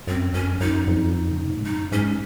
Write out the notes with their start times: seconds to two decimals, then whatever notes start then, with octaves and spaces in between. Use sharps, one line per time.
0.07 F#2 C4
0.34 F#2 C#4
0.60 F#2 D#4
0.87 F2
1.31 C#3
1.40 C3
1.49 A#2
1.57 G#2
1.66 F#2 D#4
1.92 G#2 C#4